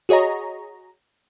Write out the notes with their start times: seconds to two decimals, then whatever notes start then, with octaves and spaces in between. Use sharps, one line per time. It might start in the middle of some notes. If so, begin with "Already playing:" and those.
0.09 F#4 G#4 C#5 D#5 A#5